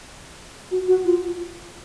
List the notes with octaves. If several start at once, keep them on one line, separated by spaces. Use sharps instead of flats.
F#4
F#4
F4